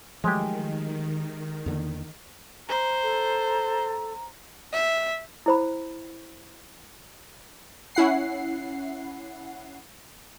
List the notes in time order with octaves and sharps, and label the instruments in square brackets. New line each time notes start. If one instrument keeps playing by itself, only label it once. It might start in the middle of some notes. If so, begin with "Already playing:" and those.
[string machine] D#3 [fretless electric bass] F3 F#3 A3 [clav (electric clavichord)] G#3 G4
[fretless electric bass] E2 D3 A#3
[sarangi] C5 [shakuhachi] A#5
[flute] A4
[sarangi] E5
[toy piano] E4 C5 B5
[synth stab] C#4 E4 F#5 C7